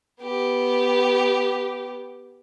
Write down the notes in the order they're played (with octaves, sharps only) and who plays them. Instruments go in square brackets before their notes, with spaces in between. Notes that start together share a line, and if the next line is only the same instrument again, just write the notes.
[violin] B3 G4